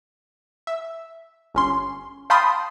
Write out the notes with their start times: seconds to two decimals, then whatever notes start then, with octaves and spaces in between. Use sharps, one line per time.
0.67 E5
1.54 G1 C#4 C6
2.30 F5 G5 A5 B5 C6 D#6